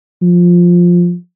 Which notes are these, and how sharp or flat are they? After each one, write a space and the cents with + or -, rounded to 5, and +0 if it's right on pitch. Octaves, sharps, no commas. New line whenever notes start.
F3 +5